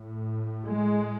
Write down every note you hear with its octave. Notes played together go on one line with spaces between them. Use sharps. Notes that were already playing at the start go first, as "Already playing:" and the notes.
Already playing: A2
G#3